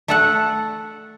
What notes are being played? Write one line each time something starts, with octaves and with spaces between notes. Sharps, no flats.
A3 A4 F#5